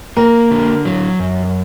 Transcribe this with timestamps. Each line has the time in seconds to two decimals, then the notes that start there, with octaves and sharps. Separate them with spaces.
0.17 A#3 A#4
0.51 D3
0.85 F#3
1.20 F#2